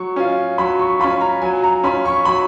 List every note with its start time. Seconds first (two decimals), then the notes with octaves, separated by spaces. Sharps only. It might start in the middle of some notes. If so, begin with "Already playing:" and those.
Already playing: F#3 C#6
0.16 C#4 F4
0.58 F#3 B5
0.79 C#6
1.00 F4 B5
1.04 C#4
1.21 A#5
1.42 F#3 G#5
1.63 A#5
1.83 C#4 F4 B5
2.05 C#6
2.25 F#3 B5